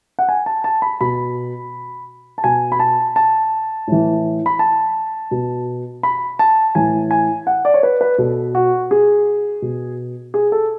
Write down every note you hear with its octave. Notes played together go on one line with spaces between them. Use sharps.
F#5
G#5
A5
A5
B5
B2 B5
A5
B2 G#5
B5
A5
A5
A2 E3
B5
A5
B2
B5
A5
A2 E3 G#5
G#5
F#5
D5
C#5
B4
B4
B2 A4
F#4
G#4
B2
G#4
A4